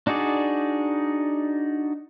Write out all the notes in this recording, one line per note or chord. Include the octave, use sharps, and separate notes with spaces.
D4 D#4 F#4 G#4 D5